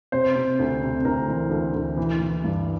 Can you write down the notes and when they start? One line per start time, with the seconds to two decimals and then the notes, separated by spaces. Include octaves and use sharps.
0.12 C3 C5
0.36 C3
0.59 D2
0.82 C3
1.05 D2 A#4
1.28 E3
1.51 D2
1.74 D2
1.97 E3
2.21 E3
2.44 G2